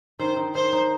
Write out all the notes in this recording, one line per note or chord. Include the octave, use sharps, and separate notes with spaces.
D#3 C5
D#3
D#3 C5
D#4